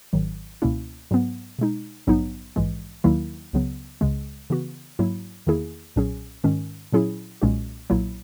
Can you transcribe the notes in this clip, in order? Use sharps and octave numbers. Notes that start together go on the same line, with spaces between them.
G#1 G#2 D#3 F#3
C#2 B2 A#3 C#4 E4
G#2 F#3 B3
B2 G#3 D#4
A#1 G#2 F#3 B3 D#4
A#1 G#2 E3 G#3
D#2 D#3 F#3 A#3 E4
C#2 C#3 F#3 B3
C#2 C#3 G#3
C#3 E3 B3 F#4
G#2 F#3 A#3 E4
E2 D#3 A#3 E4 G#4
B1 A#2 F#3 C#4 G#4
G#2 D#3 G#3 C#4
A#2 F#3 C#4 E4 G#4
B1 A#2 G#3 C#4 F#4
B1 A#2 F#3 A#3 E4